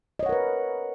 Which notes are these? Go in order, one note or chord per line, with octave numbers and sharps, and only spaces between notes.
A#4 B4 C#5 D#5 F#5